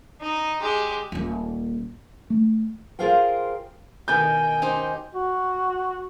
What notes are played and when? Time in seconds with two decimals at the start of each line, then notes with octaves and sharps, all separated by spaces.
0.21 D#4
0.61 G#3 G4
1.12 D#1 A#3
2.30 A3
2.99 F4 G#4 A#4 C5 F5 G5
4.08 B2 D#3 G5 G#5 G6
4.62 D#4 G4 C5
5.15 F#4